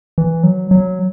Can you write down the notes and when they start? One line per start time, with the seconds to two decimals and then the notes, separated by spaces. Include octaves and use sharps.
0.18 E3
0.43 F#3
0.71 F#3